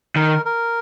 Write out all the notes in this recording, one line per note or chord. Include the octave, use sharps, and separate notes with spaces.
D#3 A#4
A#4